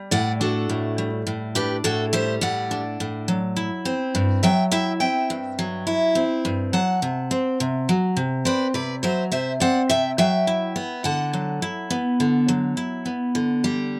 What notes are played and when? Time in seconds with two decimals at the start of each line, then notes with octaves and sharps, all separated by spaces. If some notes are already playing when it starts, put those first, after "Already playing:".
Already playing: G3
0.11 A2 D5 F#5
0.41 D4 F#4 A4
0.69 A2
0.98 G3
1.27 A2
1.55 D4 G4 B4
1.84 A2 F#4 A4
2.13 G3 C5 E5
2.41 A2 D5 F#5
2.71 D4
3.00 A2
3.28 F#3
3.56 E4
3.85 C4
4.15 G2
4.43 F#3 E5 G5
4.71 E4 E5 G5
5.00 C4 E5 G5
5.30 G2
5.59 F#3
5.87 E4
6.15 C4
6.45 G2
6.73 F#3 F#5 A5
7.02 C3
7.31 C4
7.60 C3
7.89 F#3
8.17 C3
8.45 C4 B4 D5
8.74 C3 B4 D5
9.03 F#3 C5 E5
9.32 C3 C5 E5
9.60 C4 D5 F#5
9.89 C3 E5 G5
10.18 F#3 E5 G5
10.47 E4
10.76 B3
11.04 D3 F#5 A5
11.33 F#3
11.62 E4
11.90 B3
12.20 D3
12.48 F#3
12.77 E4
13.06 B3
13.35 D3
13.64 G3